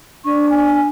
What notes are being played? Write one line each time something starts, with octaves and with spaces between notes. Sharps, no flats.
D4 C#6
G#5